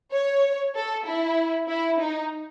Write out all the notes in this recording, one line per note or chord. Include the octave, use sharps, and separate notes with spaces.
C#5
A4
E4
E4
D#4